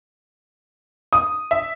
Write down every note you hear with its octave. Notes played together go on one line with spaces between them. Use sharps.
D#6
E5